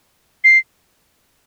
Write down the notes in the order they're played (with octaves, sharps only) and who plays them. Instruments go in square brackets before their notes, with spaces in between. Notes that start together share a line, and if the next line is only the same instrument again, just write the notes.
[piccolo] C7